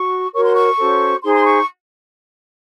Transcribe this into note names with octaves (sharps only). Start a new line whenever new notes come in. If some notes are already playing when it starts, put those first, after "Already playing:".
Already playing: F#4 C#6
F#4 A#4 C#5 C#6
C6
C#6
C#4 F#4 A4 C5
D#4 G#4 C5 C6
C6
C#6